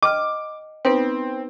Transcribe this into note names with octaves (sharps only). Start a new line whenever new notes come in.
D#5 G5 D6 F6
B3 C4 D#4 B4